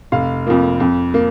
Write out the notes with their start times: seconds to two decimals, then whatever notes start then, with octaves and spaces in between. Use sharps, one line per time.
0.12 F1 F5
0.46 F2 F3 A#3
0.80 F2
1.14 A#3